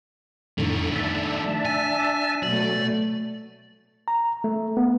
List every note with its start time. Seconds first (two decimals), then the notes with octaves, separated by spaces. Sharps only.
0.58 F2 A2 D3 D#3 A3
0.95 D4 E5 A5
1.65 G#5
2.43 B2 F#3 A3 D5
4.08 A#5
4.44 A3
4.77 B3